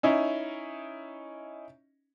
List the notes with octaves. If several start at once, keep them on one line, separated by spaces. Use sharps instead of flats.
C#4 D#4 E4